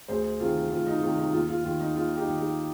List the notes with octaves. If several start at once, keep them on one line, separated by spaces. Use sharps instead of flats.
D2 G#4 C5
C3 D#3 F4 G#4
D2 F4
D#4
C3 D#3 F4
D#4
D#2 F4
F4
D#3 F4
D#4
D#2 F4
D#4 G4
D#3
D#4 G4